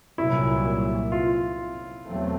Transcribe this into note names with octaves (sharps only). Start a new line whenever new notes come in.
C2 A#2 F#3 E4
F4
E2 B2 F#3 A3 C4